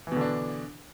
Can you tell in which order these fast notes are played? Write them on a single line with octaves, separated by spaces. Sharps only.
E3 B2 D3 D4